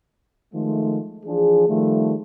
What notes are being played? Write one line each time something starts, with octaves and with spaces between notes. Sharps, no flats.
D#3 F3 G#3 A3
E3 F3 D4 G#4
D#3 F3 G3 A3